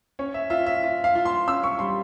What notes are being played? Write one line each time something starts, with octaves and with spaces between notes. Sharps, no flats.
C#4 C#5
E5
F4 E5
E5
F4
F5
F4
C6
C#4 E6
C#6
G3 C6